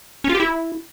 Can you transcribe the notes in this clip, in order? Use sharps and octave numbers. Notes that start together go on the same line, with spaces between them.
C#4
F4
G4
E4